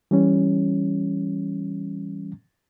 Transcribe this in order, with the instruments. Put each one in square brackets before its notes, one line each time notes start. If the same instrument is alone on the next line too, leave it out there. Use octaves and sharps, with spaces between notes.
[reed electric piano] E3 G3 C#4